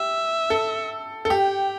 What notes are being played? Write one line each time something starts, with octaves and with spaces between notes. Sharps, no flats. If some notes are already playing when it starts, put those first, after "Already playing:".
Already playing: G4 E5
A4
A4
G4 G5